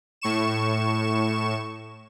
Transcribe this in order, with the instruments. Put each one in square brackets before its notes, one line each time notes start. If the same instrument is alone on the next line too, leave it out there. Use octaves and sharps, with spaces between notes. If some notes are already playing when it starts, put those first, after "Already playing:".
[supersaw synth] A2 C#6 E7